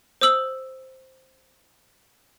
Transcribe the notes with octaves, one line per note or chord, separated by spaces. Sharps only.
C5 D#6 E6 F#7